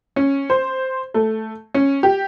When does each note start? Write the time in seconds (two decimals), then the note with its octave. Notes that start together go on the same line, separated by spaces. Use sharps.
0.16 C#4
0.50 C5
1.14 A3
1.74 C#4
2.03 G4